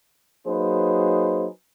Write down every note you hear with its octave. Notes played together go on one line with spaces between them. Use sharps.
F#3 A#3 D#4 G#4 B4 C5